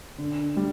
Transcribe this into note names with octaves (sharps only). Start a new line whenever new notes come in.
D3
G3